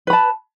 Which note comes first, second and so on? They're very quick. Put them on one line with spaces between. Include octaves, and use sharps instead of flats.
B4 B5 A5